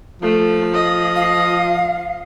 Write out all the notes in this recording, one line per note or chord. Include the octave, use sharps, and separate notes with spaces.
F3 A3
D#5
F5